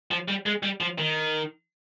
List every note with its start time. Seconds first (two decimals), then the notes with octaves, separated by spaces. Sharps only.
0.11 F3
0.28 G3
0.46 G#3
0.63 G3
0.81 F3
0.98 D#3